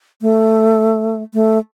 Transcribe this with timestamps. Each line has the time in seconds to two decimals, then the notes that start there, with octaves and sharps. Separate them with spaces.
0.22 A3
1.34 A3